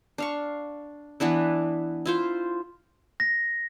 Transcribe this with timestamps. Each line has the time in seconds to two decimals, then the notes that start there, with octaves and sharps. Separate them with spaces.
0.18 D4 F5 C#6
1.20 E3 B3 D4 E4
2.06 E4 F4 C5
3.20 A#6